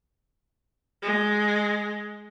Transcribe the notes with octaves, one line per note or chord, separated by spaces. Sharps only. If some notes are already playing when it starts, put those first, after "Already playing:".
G#3